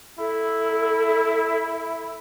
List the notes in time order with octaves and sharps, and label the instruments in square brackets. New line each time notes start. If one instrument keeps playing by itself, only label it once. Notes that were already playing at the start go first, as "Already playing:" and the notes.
[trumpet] E4 [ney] A4